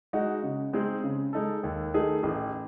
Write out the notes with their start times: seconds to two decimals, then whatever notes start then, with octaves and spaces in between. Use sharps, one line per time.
0.13 G#3 D#4 F#4
0.43 C#3
0.73 G#3 C4 D#4 G#4
1.04 C#3
1.33 G#3 D#4 A4
1.63 D#2
1.94 D#3 A3 D#4 G#4
2.23 A1